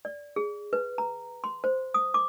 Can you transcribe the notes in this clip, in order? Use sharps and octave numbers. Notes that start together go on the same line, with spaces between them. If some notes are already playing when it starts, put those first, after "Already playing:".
D5
G#4
B4
A#5
C6
C5
D#6
D6